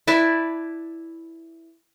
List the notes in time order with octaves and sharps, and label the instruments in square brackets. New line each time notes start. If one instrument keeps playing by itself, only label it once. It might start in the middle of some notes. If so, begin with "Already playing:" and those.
[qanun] E4 B4 D5 A5